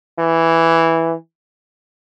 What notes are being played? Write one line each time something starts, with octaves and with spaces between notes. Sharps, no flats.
E3